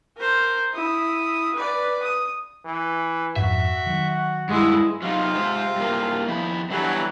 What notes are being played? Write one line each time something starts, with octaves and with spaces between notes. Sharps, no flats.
A#4 C5
E4 D#6
B4 D5
D#6
E3
F2 G#2 F#4 E5
D#3 F#3
G2 G#3 E4
C3 F#3 D#4 F4
G#3 C5
G2 A#3
F2 E4
D3 E3 F#3 G3